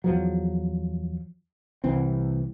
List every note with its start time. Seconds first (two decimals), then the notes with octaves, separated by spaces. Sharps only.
0.04 E2 F3 F#3
1.84 C2 E3 C4